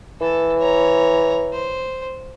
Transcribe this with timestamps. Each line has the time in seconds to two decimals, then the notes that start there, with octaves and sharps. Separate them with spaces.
0.21 E3 A4
0.58 C#5 A#5
1.53 C5